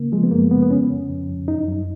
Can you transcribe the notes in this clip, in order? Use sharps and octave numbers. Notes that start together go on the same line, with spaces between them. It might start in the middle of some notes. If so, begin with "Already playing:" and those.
Already playing: C#3 A#3
F3 G#3
B3
F#2 A#3
C#3 B3
B3
F2 C#4
F2
F2
F2
F#2 D#4
F#2